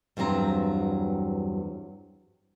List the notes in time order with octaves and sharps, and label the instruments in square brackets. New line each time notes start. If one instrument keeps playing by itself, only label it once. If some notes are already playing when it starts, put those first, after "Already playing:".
[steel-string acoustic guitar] E2 G2 F#3 C4 A#5